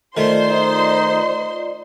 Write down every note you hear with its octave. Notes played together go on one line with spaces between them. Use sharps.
D#3 A3 F4 C5 D5 D#5 C6
D#4